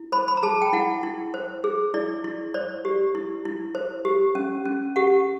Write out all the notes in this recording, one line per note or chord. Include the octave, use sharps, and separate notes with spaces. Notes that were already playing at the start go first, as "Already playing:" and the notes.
Already playing: E4
C5 B5
B5
A#5
G#4 A5
G5
E4 F#5
E4
C5
G#4
E4 D5
E4
C5 D5
G4
E4
E4
C5
G4
C#4
C#4
G4 F#5